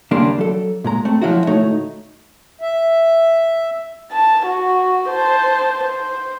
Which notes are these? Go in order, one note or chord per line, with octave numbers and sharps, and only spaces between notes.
D#2 C#3 G3 A#3 D4 C6
F#3 A4
A#2 G#3 A#5
A3 C4
F3 F#3 G#3 E4 F#4
D2 A2 A3 D#4 C#5
E5
A5
F#4
C5 A5
C5